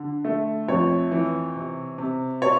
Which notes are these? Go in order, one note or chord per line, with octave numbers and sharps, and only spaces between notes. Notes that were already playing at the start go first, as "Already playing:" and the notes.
Already playing: D3
A3
F2 C#5
E3
C3
C3
C#5